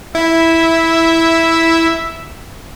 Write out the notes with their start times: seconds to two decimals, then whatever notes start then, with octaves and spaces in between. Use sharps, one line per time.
0.15 E4 E5